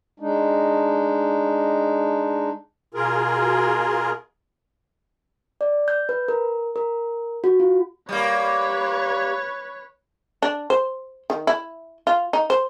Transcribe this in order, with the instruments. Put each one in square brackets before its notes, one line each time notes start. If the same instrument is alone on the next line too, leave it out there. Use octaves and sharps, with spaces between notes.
[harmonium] G#3 D4 D#4
[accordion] B2 F4 G#4 A#4
[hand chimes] D5
G6
B4
A#4
A#4
F#4
F4
[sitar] G3 A#3 [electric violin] B4 C#5
[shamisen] D4
C5
D#3
E4
F4
D#4
C5